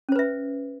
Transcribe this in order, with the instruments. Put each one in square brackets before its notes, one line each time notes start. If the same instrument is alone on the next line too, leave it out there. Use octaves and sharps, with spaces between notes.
[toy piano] C#4
C5
B4
E5